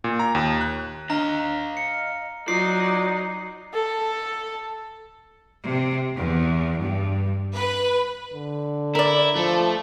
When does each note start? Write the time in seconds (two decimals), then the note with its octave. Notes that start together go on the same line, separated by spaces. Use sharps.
0.04 A#2
0.19 A#5
0.35 D#2
0.61 F#6
1.10 D4 D#5 F5 A#5
1.77 C#7
2.48 F#3 D#4 F4 D5 C7
3.74 A4
5.65 C3
6.16 E2
6.78 G2
7.55 B4
8.33 D3
8.95 E4 A#4 D5
9.36 F3 A3